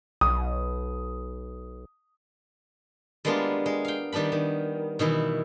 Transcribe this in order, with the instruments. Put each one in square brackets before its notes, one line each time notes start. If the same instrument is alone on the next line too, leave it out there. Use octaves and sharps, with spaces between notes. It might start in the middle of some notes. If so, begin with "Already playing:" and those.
[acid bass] B1 [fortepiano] D#6
[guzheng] G3 G#3 A#3 B3 D4 F4
G#3
F5 G5
D#3 G3 B3 D4 B5
D#3
B2 D#3 E3 E4